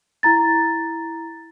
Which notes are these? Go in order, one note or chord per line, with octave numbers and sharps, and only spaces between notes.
E4 A#5 A6